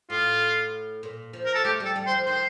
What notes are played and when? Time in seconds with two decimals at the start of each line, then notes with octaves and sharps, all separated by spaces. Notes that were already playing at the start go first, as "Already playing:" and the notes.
0.10 A2 F4
1.03 A#2
1.33 F3
1.45 A#4
1.55 A4
1.64 A3 G4
1.80 G3 A4
1.96 G3
2.06 C5
2.11 F3
2.26 D#3 C5